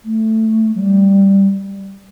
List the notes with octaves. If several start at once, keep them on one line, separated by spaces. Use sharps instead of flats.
A3
F#3
G3